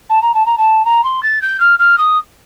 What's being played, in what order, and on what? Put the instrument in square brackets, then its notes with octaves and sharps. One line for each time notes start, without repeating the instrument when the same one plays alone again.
[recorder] A5
A#5
A5
A#5
A5
A#5
C6
A6
G6
F6
F6
D#6